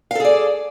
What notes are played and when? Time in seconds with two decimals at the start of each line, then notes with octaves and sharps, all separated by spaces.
0.11 F5
0.15 A4
0.20 G#4
0.25 D5